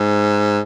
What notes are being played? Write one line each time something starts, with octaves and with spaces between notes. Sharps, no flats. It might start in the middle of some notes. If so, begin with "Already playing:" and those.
Already playing: G#2